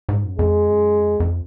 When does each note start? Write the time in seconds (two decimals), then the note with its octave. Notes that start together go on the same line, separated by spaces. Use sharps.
0.09 G#2
0.24 F#2
0.38 F2 G#3
0.69 F#2
0.99 F2
1.20 F2